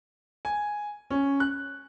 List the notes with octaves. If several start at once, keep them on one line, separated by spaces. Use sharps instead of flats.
G#5
C#4
F#6